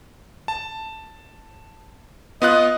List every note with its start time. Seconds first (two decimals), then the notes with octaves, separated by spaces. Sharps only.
0.48 A5
2.42 B3 F4 D#5 F#6